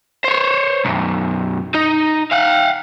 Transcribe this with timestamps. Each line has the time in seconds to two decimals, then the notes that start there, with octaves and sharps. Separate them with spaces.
0.24 C5 C#5
0.85 B1 F#2
1.75 D#4
2.32 F5 F#5